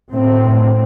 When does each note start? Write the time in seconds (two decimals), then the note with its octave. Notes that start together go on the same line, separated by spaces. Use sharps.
0.13 A2 C4
0.45 A2